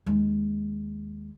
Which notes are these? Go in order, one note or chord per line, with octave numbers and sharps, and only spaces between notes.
D#2 G#3